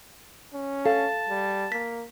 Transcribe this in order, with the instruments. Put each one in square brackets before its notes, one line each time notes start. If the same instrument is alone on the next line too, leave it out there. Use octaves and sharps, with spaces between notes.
[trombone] C#4
[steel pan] A4 [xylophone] F5 [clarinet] A5
[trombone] G3
[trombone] A#3 [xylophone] B6